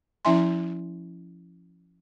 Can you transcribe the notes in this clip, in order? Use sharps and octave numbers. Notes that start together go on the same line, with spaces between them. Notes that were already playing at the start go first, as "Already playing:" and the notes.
F3 C#4 E4 E5 G#5 C6